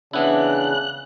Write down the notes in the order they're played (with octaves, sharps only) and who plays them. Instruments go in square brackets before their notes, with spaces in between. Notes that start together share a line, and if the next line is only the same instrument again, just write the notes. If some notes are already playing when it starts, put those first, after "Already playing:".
[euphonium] C#3 [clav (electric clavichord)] E3 B3 E4 [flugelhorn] D4 [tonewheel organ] F#6